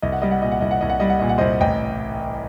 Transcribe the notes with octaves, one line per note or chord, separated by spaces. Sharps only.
C2 D#5
F#5
G3 D#5
F#5
A#2 D#5
F#5
C2 D#5
F#5
C2 D#5
F#5
G3 D#5
F#5
A#2 D#5
F#5
C2 C5 D#5
A1 D#5 G5